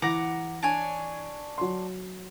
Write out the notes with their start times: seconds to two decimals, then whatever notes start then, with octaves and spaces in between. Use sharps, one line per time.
0.02 E3 F#5 A#5 D6 A#6
0.63 D4 C#5 G#5
1.58 F#3 C6